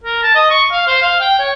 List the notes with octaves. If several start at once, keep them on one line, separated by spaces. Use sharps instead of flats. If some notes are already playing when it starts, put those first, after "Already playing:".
A#4
A5
D#5
C#6
F5
C5
F5
G5
C#5